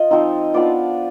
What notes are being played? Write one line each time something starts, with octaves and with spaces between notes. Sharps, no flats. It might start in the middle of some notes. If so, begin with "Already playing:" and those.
Already playing: F4 D#5
F3 C4 D#4
F3 B3 D4 F4 D5